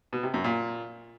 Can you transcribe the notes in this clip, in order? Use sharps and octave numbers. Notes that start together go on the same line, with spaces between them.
B2
C3
F#2
A#2